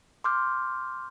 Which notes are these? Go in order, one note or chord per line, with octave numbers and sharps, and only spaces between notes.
C6 D6 F6 G6